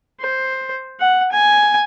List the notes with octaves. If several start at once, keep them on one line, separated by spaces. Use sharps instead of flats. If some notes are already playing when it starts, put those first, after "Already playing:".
C5
F#5
G#5